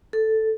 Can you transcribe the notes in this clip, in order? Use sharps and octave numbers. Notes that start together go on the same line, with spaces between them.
A4